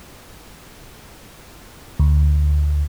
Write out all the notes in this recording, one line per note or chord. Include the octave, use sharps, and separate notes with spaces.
D2